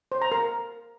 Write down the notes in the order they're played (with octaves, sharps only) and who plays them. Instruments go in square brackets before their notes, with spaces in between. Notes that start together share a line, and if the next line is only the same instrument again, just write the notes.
[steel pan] C5
A#5
A#4